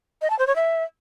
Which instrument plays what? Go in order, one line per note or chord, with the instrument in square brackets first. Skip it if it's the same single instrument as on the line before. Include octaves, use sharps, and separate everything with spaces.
[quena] D#5
A5
C5
C#5
E5